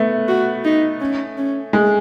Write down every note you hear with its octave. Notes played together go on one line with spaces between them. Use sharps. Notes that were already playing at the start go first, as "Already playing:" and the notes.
Already playing: A3 B3
F#4
D#4
C#4
C#4
G#3